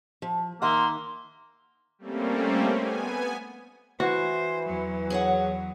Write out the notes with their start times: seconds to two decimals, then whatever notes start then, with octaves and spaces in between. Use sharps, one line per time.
0.22 F3
0.62 D#3 A#3 E5 F#5 C6
1.99 G3 A3 A#3 C4 C#4
2.71 B3 G#5
4.00 E3 F#4 C5
4.66 E2 F#3
5.10 G#4 C#5 F#5